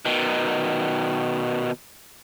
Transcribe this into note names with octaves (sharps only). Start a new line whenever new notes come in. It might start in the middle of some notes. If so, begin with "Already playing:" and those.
B2 D#3